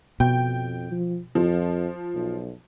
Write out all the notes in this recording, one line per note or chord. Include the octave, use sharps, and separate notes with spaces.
F2 B2 G5
F3
F2 F3
B1